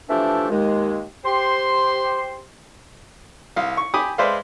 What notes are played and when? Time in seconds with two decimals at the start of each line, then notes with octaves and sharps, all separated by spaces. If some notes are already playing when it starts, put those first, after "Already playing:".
0.10 E3 F3 A3 D4 G4 E5
0.51 D#2 G#3
1.25 G4 C5 C6
3.56 C2 F5
3.77 C#6
3.94 G4 G#5 B5 D6 D#6
4.18 G#3 B4 C5 D5 E5 F5